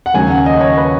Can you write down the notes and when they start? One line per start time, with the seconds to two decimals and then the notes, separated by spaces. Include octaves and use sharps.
0.06 F#5
0.14 D#2 C#3 F#3 G#5
0.30 F#5
0.46 D#5
0.61 C#5
0.77 B4